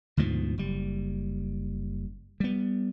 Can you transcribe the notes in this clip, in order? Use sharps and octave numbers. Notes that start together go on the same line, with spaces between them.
D2 G#2 B2 F3
F#1 G3
G3 B3